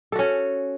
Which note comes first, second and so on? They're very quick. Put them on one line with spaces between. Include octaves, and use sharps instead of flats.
A4 F#4 C#4